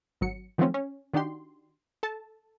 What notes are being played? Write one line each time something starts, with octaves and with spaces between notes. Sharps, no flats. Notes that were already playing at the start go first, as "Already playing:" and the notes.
G#1 F#3 C#7
D#3 F3 F#3 A3 C4 C#4
C#4
D#3 D4 D#4 F#4 G4 C6
A4 A5